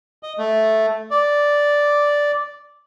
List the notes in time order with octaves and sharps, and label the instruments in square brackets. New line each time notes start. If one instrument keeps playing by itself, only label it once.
[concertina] D#5
A3
D5